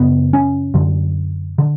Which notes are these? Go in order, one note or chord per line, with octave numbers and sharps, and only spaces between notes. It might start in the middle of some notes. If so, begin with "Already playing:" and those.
Already playing: F#2 C#3 B3
C#4
F#2 D3
D3